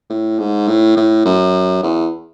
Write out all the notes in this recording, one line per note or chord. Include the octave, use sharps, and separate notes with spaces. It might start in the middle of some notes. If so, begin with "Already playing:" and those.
A2
G#2
A2
A2
F#2
E2